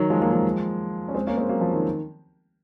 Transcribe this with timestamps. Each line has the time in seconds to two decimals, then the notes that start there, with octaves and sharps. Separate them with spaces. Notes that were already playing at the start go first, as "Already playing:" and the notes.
Already playing: D#3 F#3
0.10 F3 G#3
0.22 F#3 A#3
0.33 F3 G#3
1.08 C#4
1.14 G#3 C4
1.27 A#3 C#4
1.38 G#3 C4
1.49 F#3 A#3
1.61 F3
1.74 D#3